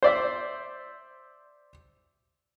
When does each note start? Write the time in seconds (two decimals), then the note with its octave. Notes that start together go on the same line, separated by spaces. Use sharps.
0.03 C5 D5 E5